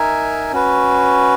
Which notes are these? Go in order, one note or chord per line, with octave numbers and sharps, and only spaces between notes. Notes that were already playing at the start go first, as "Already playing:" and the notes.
Already playing: D#4 A#4 E5 G#5
C#4 F#4 B4